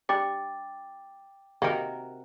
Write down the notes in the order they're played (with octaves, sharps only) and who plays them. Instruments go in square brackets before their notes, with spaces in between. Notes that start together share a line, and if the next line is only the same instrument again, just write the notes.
[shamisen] G3 D4 [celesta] G5 D6 A6
[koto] C3 F#4 A#4 [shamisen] A#3 D#4